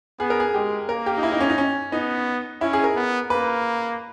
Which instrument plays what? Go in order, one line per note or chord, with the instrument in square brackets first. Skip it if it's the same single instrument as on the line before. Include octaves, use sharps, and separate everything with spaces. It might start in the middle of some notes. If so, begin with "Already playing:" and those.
[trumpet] B3 [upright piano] G#4
[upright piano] A#4
G#4
[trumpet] G#3 [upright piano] G4
[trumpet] A#3 [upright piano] A#4
[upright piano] G4
D#4
E4
D#4
C#4
D#4
C#4
[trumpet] B3 [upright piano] D#4
[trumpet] C#4 [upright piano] E4
[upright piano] G#4
A#4
[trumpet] B3
[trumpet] A#3 [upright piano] B4